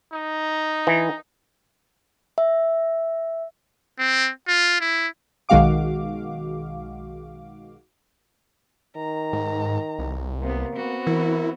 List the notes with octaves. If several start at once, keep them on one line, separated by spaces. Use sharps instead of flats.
D#4
E3
E5
C4
F4
E4
B1 D#3 G#3 F#4 F5 D6
D#3 A#5
G#2
C2
C3 A#3 B3
B3 C4 F#4
E3 E4 A#4